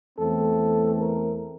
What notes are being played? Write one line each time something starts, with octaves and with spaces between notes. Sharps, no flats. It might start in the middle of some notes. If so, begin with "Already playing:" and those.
E2 E3 A3 C4 A4
A#4